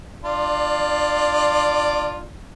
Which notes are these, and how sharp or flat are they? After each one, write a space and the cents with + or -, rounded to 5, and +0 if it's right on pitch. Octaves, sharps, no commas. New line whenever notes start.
D4 +30 F4 +0 D5 +0